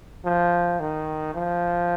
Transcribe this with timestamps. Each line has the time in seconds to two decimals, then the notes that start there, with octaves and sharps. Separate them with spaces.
0.25 F3
0.80 D#3
1.35 F3